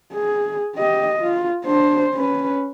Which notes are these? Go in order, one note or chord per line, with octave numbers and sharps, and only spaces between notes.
G#4
G4 D#5
F4
D4 C5
C#4 B4